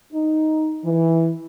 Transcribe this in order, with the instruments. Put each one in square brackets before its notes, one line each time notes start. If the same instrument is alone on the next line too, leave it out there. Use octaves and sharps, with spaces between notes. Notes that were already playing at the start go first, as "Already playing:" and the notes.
[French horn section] D#4
E3